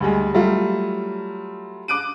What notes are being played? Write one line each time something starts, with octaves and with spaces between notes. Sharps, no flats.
D2 G3 G#3
F#3 G3 A3 F4
D6 F#6 D7 D#7